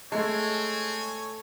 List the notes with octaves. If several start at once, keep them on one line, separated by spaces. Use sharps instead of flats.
G#3 A3 C4 C#5 G#5 A5